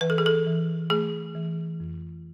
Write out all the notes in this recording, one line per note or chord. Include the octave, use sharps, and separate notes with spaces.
E3 B4
A4
G#4
A4
E3
A3 G#4
E3
F2